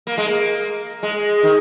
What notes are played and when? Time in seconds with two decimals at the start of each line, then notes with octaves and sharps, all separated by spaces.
0.07 A#3
0.18 G#3
0.28 A#3
1.03 G#3
1.43 D#3